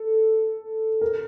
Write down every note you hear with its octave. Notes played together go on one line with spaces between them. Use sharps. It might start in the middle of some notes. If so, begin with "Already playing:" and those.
Already playing: A4
A#4